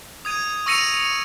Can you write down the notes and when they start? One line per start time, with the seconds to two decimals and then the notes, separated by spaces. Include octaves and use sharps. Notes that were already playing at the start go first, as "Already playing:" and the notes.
0.25 D#6 G#6 D#7
0.66 C#6 E6 A#6 C#7 D#7 F7